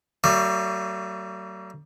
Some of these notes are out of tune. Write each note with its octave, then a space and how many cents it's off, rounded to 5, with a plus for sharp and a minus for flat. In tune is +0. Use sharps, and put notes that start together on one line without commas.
F#3 +40 A3 +45 D5 +15